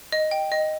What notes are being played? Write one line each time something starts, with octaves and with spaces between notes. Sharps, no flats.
D#5
G5
D#5